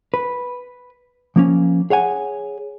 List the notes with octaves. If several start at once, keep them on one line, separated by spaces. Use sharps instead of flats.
B4
F3 A#3 C#4
G#4 C#5 F#5 G#5